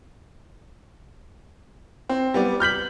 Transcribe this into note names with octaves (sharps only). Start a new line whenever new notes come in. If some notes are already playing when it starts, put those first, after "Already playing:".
C4
G3 B3 D5
F6 G6 B6 F#7